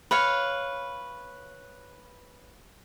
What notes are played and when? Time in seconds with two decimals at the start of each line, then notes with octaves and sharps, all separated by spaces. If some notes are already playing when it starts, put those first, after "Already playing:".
0.11 B4 C#5 F5